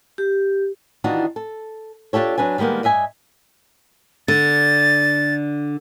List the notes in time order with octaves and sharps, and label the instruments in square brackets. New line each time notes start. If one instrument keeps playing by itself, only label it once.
[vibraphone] G4
[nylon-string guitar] D#3 E3 D4 D#4 F4 F#4
A4
D4 F4 G4 A4 C#5
F#3 D4 B4 G#5
D#3 G3 G#3 A#3 B3
G2 D#5 E5 G#5
[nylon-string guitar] D3 [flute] A6